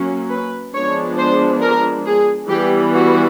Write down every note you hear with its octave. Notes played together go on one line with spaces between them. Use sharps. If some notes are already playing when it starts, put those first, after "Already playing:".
Already playing: F#3 A#3 C#4
B4
F3 G#3 B3 D4 C#5
C5
A#4
G#4
E3 G3 B3 G4
F#4